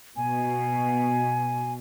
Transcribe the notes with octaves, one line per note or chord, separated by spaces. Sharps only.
B2 G#5